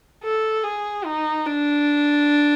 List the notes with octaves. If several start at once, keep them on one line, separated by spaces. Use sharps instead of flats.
A4
G#4
D#4
D4